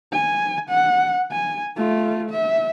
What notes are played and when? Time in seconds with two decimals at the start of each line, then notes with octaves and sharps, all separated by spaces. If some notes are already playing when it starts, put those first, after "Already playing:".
0.12 G#5
0.69 F#5
1.31 G#5
1.76 A3 F4
2.30 E5